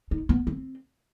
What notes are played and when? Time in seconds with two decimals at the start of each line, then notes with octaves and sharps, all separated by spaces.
0.11 D#4
0.29 B3
0.47 C4